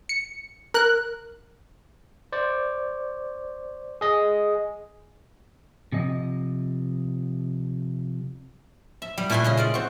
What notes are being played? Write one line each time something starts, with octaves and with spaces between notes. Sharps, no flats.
C#7
A#4 F#6
C5 D5
G#4 D#5
C3 F3 D#5
E5
G3
A#2 A3 E4 B4 G#5 C6
C#3 D#5 C6
G#3 F4 D5
C4 F#4